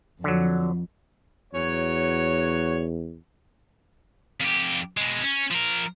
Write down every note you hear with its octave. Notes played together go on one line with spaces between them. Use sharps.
F2 D3 F#3
E2 F#3 F#4 C#5
F2 G4
B2 G#3
C#4
F3 A#4